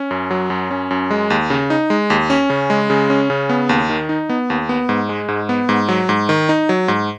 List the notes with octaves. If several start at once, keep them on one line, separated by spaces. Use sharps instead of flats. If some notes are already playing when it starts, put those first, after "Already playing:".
Already playing: C#4
F#2
F#3
F#2
C#4
F#2
G#3
D#2
C#3
D#4
G#3
D#2
C#4
C#3
G#3
C#3
C#4
C#3
B3
D#2
D#3
D#4
B3
D#2
B3
G#2
G#3
G#2
B3
G#2
F#3
G#2
D#3
D#4
F#3
G#2